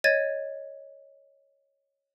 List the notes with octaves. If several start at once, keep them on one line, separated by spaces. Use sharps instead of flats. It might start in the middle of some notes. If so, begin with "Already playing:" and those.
C#5 D#5 G#6 A6 D#7